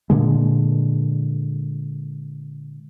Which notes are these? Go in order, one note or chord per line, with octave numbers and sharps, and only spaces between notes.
A#2 D3 G#3